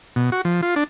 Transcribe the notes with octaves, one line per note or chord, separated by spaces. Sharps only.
B2
F#4
F3
F4
D4